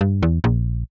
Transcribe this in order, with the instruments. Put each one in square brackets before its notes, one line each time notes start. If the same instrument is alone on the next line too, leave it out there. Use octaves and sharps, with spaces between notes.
[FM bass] G2
E2
A#1